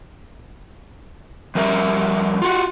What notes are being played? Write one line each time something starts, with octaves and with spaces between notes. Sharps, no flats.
F2 G3 A#4 E5
F4 F#4